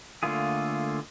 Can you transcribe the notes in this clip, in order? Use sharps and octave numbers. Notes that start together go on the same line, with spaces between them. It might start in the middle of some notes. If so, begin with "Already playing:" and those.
D3 A3 A#3 F4 G#4